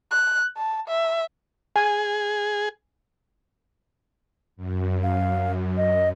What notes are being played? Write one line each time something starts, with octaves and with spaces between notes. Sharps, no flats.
F#6
A5
E5
G#4 G#5
F#2
F5
D#5